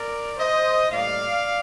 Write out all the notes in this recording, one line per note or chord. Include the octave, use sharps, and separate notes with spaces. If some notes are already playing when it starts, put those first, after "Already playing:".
Already playing: A#4 D5
C5 D#5
A2 G3 A#3 D5 F5